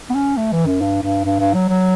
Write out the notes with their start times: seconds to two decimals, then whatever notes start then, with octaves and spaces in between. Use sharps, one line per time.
0.10 B3
0.15 C#4
0.37 A3
0.52 E3
0.66 F#2
0.81 G2
1.03 G2
1.25 G2
1.39 G2
1.54 F#3
1.69 F#3